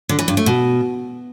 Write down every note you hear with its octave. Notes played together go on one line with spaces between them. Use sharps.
D3
E3
G2
A3
B2